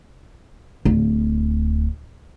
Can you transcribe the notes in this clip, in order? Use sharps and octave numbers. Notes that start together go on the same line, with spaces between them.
D1